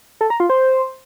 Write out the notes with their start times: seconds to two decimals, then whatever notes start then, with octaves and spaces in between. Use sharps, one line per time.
0.21 A4
0.30 A#5
0.40 F4
0.50 C5